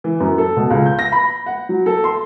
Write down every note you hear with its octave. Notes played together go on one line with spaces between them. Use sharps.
E3
F#2
A4
B2
C#2
G6
A#6
B5
F#5
F#3
A4
C6